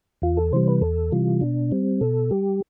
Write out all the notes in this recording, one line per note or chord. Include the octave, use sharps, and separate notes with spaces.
E2 F4
A4
C3 E3 G3 C5
B4
E2 A4
C3 E3 G3 F4
B2 D4
G3 C4
B2 A4
G3 G4